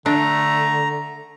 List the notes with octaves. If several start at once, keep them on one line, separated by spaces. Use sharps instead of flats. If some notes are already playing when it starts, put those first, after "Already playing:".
D3 A3 D4 A#5